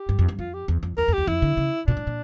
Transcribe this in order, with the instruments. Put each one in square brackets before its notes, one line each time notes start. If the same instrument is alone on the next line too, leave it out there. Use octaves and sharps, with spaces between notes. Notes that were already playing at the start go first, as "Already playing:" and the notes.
Already playing: [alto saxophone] G4
[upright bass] G2
F2
G2
[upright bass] F2 [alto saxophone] F4
[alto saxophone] G4
[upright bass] E2
F2
[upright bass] E2 [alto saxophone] A#4
[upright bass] F2
[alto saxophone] G4
[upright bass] E2
[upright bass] F2 [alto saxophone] E4
[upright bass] D3
C#3
[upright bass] A#2 [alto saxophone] D4
[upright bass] A2
A#2